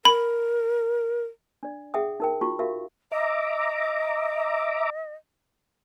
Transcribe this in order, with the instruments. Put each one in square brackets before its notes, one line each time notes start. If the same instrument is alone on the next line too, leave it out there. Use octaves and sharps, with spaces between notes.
[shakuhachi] A#4 [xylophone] B5
[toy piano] D4 D5
G#4 E5 F#5 G5 D#6
D#4 A#4 G5
D#4 F4 F#4 C#6
F#4 G4 A#4 E5 F5
[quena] D#5 [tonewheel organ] E5 A#5 D6